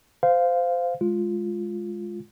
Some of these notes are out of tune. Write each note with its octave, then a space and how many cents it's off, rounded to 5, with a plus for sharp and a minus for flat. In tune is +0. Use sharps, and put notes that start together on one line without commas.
C5 -20 F5 +0
G#3 +0 F4 +0